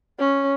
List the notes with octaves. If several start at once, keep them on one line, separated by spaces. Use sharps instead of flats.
C#4